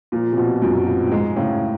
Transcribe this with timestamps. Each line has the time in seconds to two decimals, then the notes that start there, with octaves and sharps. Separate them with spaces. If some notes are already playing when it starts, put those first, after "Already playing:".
0.12 A#2 F3
0.32 C3
0.37 B2 F3
0.62 F#2 F3
0.87 F3
1.07 A2
1.12 G#2 G#3
1.36 A2 C#3